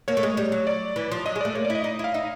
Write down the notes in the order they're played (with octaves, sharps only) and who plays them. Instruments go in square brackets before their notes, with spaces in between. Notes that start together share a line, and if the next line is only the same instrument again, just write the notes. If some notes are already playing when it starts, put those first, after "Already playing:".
[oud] A#3 [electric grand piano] C#5
[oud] A3
G#3
G3
F#3
[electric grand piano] D5
[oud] E3
F3
[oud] F#3 [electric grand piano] D#5
[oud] G#3
[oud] A3 [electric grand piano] D5
[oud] A#3 [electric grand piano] C#5
[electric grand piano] D5
[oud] E4
[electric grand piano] D#5
[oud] D#4
[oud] E4 [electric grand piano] F5
[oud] D#4 [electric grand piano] E5